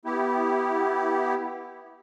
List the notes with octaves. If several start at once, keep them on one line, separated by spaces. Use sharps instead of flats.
B3 E4 G4